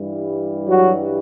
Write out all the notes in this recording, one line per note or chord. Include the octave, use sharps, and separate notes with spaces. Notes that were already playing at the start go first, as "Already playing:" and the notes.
Already playing: G2 E3 G3
F#3 F#4